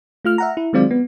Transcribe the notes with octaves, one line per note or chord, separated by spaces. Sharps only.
A3 F4 F6
E5 F#5 A#5
E4
D#3 F#3 G#3 C4 F4 D5
B3